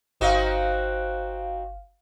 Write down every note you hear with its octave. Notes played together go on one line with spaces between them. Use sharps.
G1 C4 D#4 F#4 F5